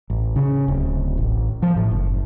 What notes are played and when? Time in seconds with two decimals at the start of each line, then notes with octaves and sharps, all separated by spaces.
0.10 A1
0.36 C#3
0.68 D1
1.18 A1
1.62 F3
1.76 A2
1.91 F#1